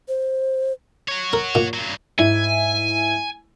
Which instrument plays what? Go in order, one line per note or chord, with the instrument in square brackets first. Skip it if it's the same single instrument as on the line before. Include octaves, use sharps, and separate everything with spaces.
[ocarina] C5
[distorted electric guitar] F#4 C#5
[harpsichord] A#4
A#2
[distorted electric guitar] G2 F#3
[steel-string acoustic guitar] G#2 [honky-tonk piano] E4 [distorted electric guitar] G#5